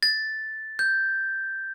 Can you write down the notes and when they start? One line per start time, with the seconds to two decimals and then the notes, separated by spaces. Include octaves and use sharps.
0.03 A6
0.79 G6